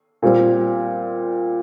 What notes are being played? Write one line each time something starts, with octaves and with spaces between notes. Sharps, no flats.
A#2 G3 C4